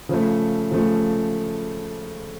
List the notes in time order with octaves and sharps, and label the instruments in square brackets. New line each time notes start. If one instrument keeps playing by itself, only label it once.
[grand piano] C#3 F3 A3
C#3 F3 A3